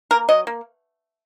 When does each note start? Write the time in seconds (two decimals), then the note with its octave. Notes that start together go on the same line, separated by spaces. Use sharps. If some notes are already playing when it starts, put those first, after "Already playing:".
0.11 A#3 A#4
0.29 F#3 D#5
0.47 A#3